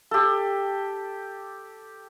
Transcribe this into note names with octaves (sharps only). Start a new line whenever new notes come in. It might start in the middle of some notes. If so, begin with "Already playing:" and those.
G4 A4